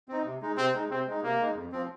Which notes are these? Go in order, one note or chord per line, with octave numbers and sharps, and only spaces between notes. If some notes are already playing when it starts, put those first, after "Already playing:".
C4 D#4
C3
G#3 D#4
C3 C4
G#3 D#4
C3 C4
G#3 D#4
C3 A#3
G#3 D#4
F2
F3 C4